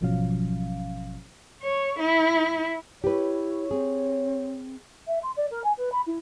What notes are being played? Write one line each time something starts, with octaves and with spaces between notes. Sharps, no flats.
G#1 B2 F3 F#3 C#4 F5
C#5
E4
E4 G4 B4 C#5
C4 G#4
E5
C6
D5
A#4
G#5
B4
B5
E4